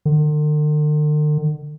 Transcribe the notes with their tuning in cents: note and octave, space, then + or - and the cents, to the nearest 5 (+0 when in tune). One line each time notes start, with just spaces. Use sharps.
D3 +45